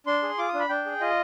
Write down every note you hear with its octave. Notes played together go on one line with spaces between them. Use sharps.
D4 C6
G#4
F4 D6
D#6
D4
B5
D4 G5
G#4
F4 D#5